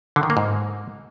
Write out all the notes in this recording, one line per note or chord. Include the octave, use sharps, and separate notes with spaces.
D3
D#3
A#3
G#2